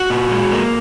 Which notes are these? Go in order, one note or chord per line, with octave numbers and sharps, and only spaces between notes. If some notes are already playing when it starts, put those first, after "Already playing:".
Already playing: F#4
A#2
G#3
A#3